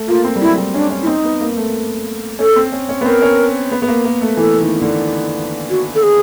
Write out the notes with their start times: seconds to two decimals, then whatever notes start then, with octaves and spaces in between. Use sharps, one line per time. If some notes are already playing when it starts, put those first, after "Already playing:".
Already playing: A3
0.08 A#3 F4
0.25 C4
0.36 G3
0.41 F#3 E4
0.58 G3
0.74 C#4 D4
0.91 C#4
1.02 E4
1.07 C4 D#4
1.24 B3
1.40 A#3
1.57 A3
2.39 C#4 A4
2.56 C4
2.72 C#4
2.89 C#4
3.01 B3
3.06 C4 A#4
3.22 C#4
3.71 B3
3.82 B3
3.88 A#3
4.05 A#3
4.22 A3
4.37 E3 A4
4.60 D#3
4.82 D3
5.70 F#4
5.95 A4
6.03 G#4